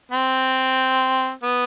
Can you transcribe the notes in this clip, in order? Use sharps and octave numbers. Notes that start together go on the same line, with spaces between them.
C4
B3